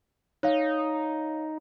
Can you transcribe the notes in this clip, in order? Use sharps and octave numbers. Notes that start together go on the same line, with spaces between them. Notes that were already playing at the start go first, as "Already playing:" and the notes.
D#4 C#5 F5